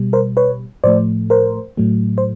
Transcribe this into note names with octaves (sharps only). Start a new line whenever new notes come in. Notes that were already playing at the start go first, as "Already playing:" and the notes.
Already playing: B2 G3
A#4 C5
B4 C#5
A2 F3 A3 C5 D5
A#4 C5
A2 F#3 A3
C5